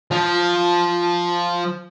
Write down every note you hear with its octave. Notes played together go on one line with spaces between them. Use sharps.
F3